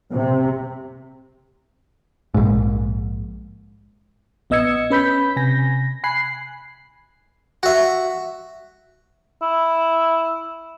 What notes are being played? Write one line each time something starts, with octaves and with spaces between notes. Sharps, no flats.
C3
A#1 G#2
A1 B3 D#5 E6 G#6 C#7
C#4 B4 B5 G6 B6
C3 G#5 A#6
G#5 B5 F#6 C7
F#4 E5
E4